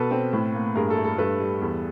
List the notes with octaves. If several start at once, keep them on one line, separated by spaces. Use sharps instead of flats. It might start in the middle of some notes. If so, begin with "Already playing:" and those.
Already playing: B2 A4 B4
C4
A2
A#3
G2 G#4 A#4
A4
A3
A4
G2 A4 B4
G3
E2